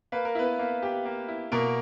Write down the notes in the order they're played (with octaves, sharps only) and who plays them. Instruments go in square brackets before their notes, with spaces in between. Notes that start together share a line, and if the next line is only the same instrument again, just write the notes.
[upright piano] A#3 [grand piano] B4
[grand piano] A#4
[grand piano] B3 B4 [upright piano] E4
[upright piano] A#3
G4
A#3
E4
[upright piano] B2 [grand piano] A#3 A#4